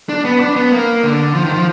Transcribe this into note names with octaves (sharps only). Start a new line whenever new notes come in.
D4
B3
D4
B3
A#3
D3
F3
D#3
F3